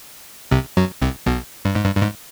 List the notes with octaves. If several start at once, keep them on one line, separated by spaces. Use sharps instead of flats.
C2 C3
F#2 F#3
C2 C3
B1 B2
G2
G#2
G2
G2
G#2